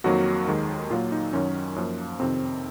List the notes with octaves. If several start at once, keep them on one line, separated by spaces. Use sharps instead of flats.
F2 D#3 F#3 A#3 F#4
D#2 D#3 G#3
A#2 F#3 A#3 F4
D#4
F#2 D#3 F#3 C#4
F#2 F3 A#3
F2 C3 D#3 C4